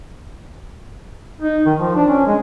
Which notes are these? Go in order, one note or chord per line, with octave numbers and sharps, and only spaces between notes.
D#4
D#3
F3
D4
C#4
G#3